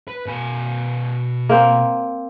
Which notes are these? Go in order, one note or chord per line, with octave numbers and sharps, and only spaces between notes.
B4
B2 G#5
A#3 C4